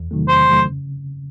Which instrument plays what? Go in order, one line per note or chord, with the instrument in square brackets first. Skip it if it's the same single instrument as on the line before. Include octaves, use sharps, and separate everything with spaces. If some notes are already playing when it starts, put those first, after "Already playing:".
Already playing: [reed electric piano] E2
C3 D#3 F#3 A3
[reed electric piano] E2 [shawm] C5
[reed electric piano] C3 D#3 F#3 A3
C#3